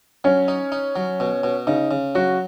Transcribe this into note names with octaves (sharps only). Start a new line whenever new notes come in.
F#3 C#4
D#4
D#4
F#3
B2
B2
C#3 D#4
C#3
F#3 F#4